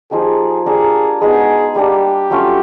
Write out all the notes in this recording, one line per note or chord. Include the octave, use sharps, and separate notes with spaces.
F3 A#3 D#4 G4 G#4
A#3 D4 G4 G#4 A#4
G#3 B3 D#4 F#4 G#4
G3 A#3 D4 G4
F#3 A3 C#4 F4